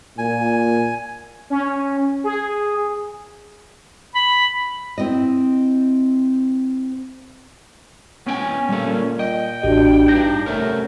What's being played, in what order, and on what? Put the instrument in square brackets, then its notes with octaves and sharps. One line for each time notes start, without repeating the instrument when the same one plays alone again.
[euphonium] A#2 [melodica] G#5
[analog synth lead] C#4
G#4
[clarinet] B5
[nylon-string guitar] C4 E4 D#5
[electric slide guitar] B3 G5 G#5 [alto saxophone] C#4
[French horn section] A#2 [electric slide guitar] G3 A4
[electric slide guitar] D#5 [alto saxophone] G5
[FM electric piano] A1 G4 [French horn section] D4 F#4
[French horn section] G2 [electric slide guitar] D4 D#4 [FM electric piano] G6 A#6
[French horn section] C3 A3 C#4 [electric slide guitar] A#4 C#5 E5